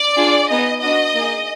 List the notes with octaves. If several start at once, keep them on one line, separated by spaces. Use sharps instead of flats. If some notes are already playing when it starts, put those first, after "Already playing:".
Already playing: D5
D4 F4 G#4
B3 D#4 G#4 D#5
B3 D4 F#4 D#5
A#3 D#4 G#4